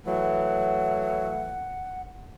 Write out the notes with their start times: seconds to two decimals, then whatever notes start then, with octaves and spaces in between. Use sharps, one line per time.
0.06 E3 F#3 A3 F#5